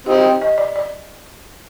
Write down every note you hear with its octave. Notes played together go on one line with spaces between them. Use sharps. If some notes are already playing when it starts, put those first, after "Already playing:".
C4 D#4 G4
D#5
D5
D5